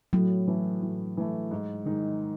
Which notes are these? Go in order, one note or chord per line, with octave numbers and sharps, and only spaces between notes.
A2 F#3
E3 A3
A2
E3 A3
G#2
D#3 G#3 D#4